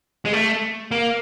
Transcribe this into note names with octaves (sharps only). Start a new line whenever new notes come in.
G#3
A3
A#3